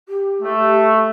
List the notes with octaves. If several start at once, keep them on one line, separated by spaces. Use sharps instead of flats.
G4
A3